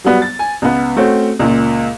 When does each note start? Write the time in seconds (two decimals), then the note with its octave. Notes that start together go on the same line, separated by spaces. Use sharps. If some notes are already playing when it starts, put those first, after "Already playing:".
0.04 F#3 G3 B3
0.22 A6
0.39 G#5
0.62 C#2 B3
0.96 A3 C4 C#4 F#4
1.39 C#2 A#2